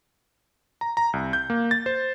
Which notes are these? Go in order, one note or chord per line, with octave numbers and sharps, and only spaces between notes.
A#5
A#5
C2
G6
A#3
A6
C5